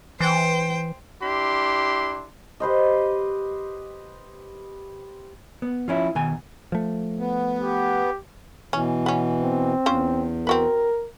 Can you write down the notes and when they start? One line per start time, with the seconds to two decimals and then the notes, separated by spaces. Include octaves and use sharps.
0.20 E3 C5 G5
1.23 D4 E4 G4 C6
2.60 G4 B4 C5 D#5
5.62 B3
5.88 F3 C#4 E4
6.15 B2 D#3 G#5
6.72 F3 A3
7.19 B3
7.59 G4
8.73 B2 E3 C#4
9.06 B3 C#4
9.41 C4
9.86 E2 C#4 F4 C5
10.47 C4 F#4 A#4 B4